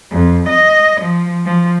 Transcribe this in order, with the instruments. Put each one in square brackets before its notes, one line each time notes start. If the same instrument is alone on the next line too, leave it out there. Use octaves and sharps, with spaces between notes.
[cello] F2
D#5
F3
F3